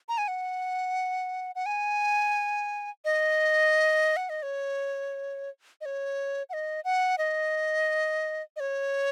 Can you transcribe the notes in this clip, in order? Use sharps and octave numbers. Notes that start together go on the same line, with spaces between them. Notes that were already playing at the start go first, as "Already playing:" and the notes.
A#5
G#5
F#5
F#5
G#5
D#5
F#5
D#5
C#5
D#5
C#5
F#5
D#5
F#5
D#5
D#5
C#5